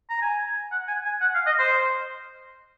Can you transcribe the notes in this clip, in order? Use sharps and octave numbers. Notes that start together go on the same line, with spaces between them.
A#5
G#5
F#5
G#5
G#5
F#5
F5
D#5
C5